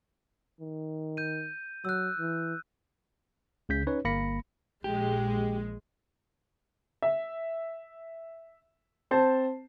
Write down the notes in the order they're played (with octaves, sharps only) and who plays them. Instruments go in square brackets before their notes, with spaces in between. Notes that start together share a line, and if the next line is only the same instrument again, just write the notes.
[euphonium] D#3
[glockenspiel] G6 D#7
[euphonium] F#3 [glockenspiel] E6 F#6
[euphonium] E3
[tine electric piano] C#2 C#3 G6 B6
C#4 D#4 B4 C#5
G1 A#3 B5 A#6 C#7
[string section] A#1 G#3 [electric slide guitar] G4
[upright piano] E5
C4 C5 A5